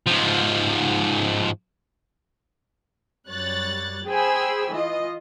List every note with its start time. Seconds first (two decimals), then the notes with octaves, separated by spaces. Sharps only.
0.06 G#2 F3
3.28 F#2 G3 C#5 F#6 A6
4.07 G#4 C5 G5 G#5 B5 E6
4.72 E3 F4 D#5